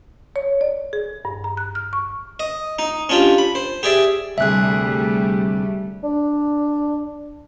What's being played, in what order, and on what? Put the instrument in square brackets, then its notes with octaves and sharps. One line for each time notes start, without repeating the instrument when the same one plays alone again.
[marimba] C#5
D5
G#4
G2
A#5
F#6
F6
C#6
[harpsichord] D#5
D#4
C#4 D4 F4 G4
B5
C5
G4 G#4 D5 E5
[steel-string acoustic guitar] D2 C3 G#4 [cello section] G3 A3 [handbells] E5 F#6
[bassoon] D4